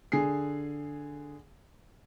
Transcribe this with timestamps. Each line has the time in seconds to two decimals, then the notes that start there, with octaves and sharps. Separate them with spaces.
0.12 D3 G#4 G#5 C7